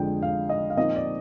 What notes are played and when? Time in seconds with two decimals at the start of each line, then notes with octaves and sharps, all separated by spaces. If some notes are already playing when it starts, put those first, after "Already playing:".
Already playing: F2 D3 G#3 D4 G5
0.22 F5
0.49 D#5
0.70 F5
0.77 A#2 F3 C4 D#4 D#5
0.96 D5